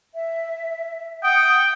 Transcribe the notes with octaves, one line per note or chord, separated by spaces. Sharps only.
E5
F#5 G5 D#6